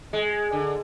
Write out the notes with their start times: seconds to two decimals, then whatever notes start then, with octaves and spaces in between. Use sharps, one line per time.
0.13 G#3
0.52 D3